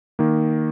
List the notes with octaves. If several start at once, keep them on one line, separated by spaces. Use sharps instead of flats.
D#3 A#3